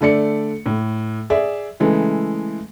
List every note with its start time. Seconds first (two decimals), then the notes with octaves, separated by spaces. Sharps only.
0.01 D3 A3 D5 C#7
0.66 A2
1.30 G#4 D5 E5
1.80 C#3 E3 G#3 A3